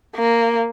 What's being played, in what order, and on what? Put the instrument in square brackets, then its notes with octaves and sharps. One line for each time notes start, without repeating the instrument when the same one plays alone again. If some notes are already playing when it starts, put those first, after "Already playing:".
[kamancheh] A#3